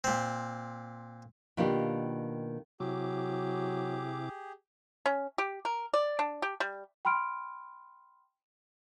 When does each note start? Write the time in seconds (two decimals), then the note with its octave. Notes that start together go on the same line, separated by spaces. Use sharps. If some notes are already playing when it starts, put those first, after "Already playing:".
0.04 A#2 C4
1.57 B2 D#3 A#3 D4 F4 G4
2.80 C3 F#3 E4 G4 G#4 D6
5.06 C#4
5.38 G4
5.65 A#4
5.93 D5
6.19 D4
6.42 G4
6.60 G3
7.05 G5 B5 C6 F6 D7